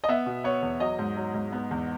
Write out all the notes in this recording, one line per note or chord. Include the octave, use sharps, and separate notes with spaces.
D#5
B3 E5
B2
B3 C#5
E2
F#3 D#5
G#2
F#3
G#2
B3
E2